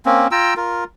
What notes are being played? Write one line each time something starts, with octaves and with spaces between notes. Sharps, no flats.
A#3 C4 C#4
F4 G5 A#5 E6
F4 A#4